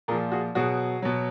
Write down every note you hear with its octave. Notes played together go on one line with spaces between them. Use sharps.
A#2 F3 G#4 A#4
F#4 G#4
B2 F#3 F#4 G#4
B2 F#3